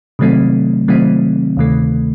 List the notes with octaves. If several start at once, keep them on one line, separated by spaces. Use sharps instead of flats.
C3 D#3 F#3 A3 C4
C3 D#3 F#3 A3 C4
D2 C3 D#3 A3